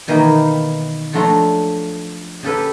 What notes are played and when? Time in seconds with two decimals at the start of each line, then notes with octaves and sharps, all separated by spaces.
0.07 B2 D#3 E3 A#3 G5 A#5
1.13 F3 F#3 A3 D4 A#5 C6
2.43 C#3 G4 A4 B4